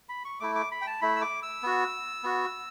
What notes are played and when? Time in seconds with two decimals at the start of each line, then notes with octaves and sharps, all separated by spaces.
0.09 B5
0.25 C#6
0.40 A3 E4 D6
0.55 D6
0.71 B5
0.82 G5
0.87 A5
1.01 A3 E4 B5
1.16 E6
1.22 D6
1.43 E6
1.63 B3 F#4
2.24 B3 F#4